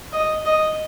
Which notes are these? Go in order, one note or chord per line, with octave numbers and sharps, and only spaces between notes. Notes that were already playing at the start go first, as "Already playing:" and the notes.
D#5
D#5